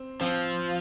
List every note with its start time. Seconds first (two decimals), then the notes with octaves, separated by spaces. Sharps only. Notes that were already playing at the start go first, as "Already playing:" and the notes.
Already playing: C4
0.21 F3 C4